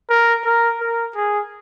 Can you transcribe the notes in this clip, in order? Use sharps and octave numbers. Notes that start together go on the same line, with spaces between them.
A#4
A#4
A#4
G#4